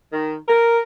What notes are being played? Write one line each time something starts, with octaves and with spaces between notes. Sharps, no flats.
D#3
A#4